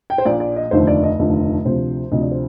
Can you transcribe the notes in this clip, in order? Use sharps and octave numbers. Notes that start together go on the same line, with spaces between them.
G5
C5
A#1 A#2 F3 D5
D5
D#5
F1 D#2 D3 F3 C5
D5
D#5
F1 D#2 D3 F3
D2 C3 F3 C5
D2 C3 F3 D#5
D5
C5